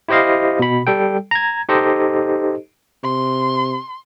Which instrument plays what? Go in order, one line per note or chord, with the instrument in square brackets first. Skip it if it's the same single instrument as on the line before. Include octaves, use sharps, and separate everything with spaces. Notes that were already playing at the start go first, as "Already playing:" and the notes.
[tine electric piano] E4 G4 C5 D#5 F5
B2 B5
G3 A4 G5
A#5 G#6
D#4 G4 A4 C5 D#5
[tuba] C3 [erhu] C6